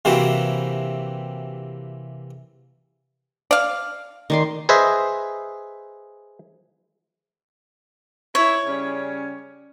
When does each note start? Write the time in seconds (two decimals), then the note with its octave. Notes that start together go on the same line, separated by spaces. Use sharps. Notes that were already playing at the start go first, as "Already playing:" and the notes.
0.05 C3 E3 A#3 C4 E4 F#4
3.51 D5 F5
4.30 D#3 D5 C6
4.69 G#4 B4 C5 D#5 E5
8.35 E4 C#5
8.66 C#3 G3 C#4